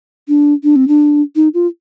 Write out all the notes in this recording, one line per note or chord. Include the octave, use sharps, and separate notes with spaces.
D4
D4
C4
D4
D#4
F4